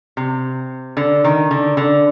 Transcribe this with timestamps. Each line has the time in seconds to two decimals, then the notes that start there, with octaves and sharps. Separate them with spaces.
0.17 C3
0.97 D3
1.24 D#3
1.51 D3
1.77 D3